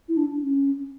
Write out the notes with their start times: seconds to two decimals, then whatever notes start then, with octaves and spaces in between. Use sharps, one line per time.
0.09 E4
0.17 D4
0.41 C#4